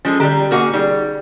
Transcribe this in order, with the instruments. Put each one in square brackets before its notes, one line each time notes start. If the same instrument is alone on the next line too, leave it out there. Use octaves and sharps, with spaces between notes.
[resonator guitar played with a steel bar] F3 G#3 A4 [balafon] C#4
[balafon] D3 D#5 A#5 [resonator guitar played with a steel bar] G3 G4
[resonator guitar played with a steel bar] A#3 F#4 G#4 [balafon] A#4 D#5
[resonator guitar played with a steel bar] G3 [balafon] D#4 G#4